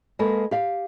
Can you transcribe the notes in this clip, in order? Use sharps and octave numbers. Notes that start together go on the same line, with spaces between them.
G#3 A#3 A4 B4
G4 F5